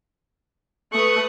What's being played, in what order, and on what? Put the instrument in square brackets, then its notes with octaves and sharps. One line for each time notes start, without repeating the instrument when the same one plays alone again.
[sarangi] A3 [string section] B4 D#6 F#6 [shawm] C#6